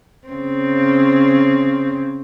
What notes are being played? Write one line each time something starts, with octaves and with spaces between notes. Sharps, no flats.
C#3 C4